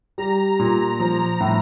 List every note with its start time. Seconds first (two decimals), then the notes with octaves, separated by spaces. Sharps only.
0.18 G3 A#5
0.59 A#2
0.99 F3 A#5
1.41 A2